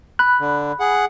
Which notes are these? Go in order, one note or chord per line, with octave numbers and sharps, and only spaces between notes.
B5 F#6
D3
G#4 F#5